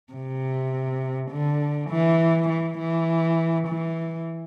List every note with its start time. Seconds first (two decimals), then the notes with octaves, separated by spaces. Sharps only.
0.13 C3
1.31 D3
1.90 E3
2.49 E3
2.79 E3
3.67 E3